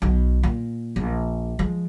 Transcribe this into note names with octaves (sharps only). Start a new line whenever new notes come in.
B1 B2
A#2
A#1
F3 G#3